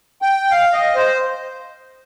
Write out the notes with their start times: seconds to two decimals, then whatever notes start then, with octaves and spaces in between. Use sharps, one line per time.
0.22 G5
0.51 F5
0.73 D#5
0.95 C5